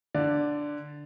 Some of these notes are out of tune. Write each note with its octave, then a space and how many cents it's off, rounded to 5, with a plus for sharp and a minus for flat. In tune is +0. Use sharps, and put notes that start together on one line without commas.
D3 +0 D5 +0